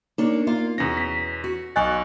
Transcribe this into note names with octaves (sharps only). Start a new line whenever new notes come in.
A#3 D4 D#4 C#5
A#3 F4 F5
E2 B2 C#4 A#6
B6
F#4
B1 D#5 G#5 C#6 F#6 A6